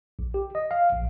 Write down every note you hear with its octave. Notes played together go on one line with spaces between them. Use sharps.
A#1
G4
D#5
F5
A#1